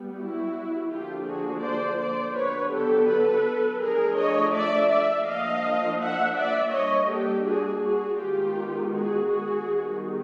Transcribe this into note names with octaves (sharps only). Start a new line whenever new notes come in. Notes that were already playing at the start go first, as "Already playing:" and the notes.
Already playing: G3 B3
E4 F#4
D3 F3 A#3 D4 F4 G4
F#4 G#4
C5 D5
C5 D5
D3 F#3 B3 B4 C#5
G4 A4
A4 B4
F3 A3 D4 G#4 A#4
C#5 D#5
D5 E5
D5 E5
F3 A#3 D4 D#5 F5
E5 F#5
D5 E5
G3 A#3 D4 C#5 D#5
G4 A4
F#4 G#4
F#4 G#4
D#3 G#3 B3 F4 G4
F#4 G#4
F#4 G#4
D#3 G3 B3